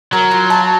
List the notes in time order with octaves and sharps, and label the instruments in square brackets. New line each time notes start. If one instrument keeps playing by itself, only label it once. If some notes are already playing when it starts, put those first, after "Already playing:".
[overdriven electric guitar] F#3 [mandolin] A#4
[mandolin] F4
A5